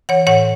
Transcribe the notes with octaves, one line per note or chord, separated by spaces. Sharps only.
E3 C#5 F#5
A2 C#5 F#5